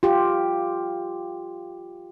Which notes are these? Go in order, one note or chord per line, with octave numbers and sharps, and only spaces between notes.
F4 G4